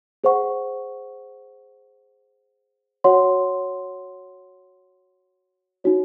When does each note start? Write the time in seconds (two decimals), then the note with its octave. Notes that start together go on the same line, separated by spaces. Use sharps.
0.24 G#4 C5 F#5 C#6
3.04 F#4 C#5 F#5 C6
5.84 D#4 F#4 C#5